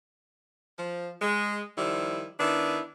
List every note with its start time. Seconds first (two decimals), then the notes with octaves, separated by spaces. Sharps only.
0.79 F3
1.22 G#3
1.78 D#3 F3 G3 E4
2.40 D#3 B3 D4 E4